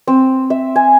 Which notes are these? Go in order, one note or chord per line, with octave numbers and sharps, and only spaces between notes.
C4
E5
G#5